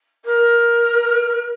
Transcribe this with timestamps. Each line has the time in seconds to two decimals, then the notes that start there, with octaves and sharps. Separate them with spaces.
0.25 A#4